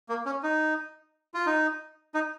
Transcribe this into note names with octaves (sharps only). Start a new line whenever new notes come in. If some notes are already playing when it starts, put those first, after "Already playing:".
A#3
C#4
D#4
F4
D#4
D#4